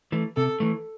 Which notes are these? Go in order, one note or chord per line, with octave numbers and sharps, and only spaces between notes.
E3 A3
C3 A4
E3 A3